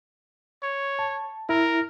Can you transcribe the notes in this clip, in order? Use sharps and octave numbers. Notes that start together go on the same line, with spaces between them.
C#5
A5
E4 A#4